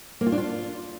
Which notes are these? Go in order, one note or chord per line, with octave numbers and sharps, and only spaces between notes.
A#3
F4
D4
F4